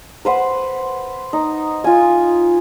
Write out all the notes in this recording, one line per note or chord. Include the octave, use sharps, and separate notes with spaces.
B4 C5 F#5
D#4
F4 G#5